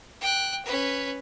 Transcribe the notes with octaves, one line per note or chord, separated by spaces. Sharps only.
G5 F#6
C#4 B4